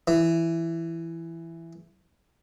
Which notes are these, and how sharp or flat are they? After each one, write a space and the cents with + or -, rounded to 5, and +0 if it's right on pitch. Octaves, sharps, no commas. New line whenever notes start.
E3 +10